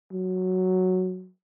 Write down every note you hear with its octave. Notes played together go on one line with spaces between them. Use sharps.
F#3